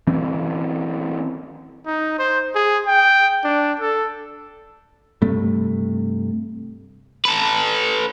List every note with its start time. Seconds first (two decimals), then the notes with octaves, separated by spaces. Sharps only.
0.07 E3 C4 C#4
1.86 D#4
2.19 C5
2.55 G#4
2.86 G5
3.44 D4
3.80 A4
5.22 G2 C3 A3
7.25 A4 B4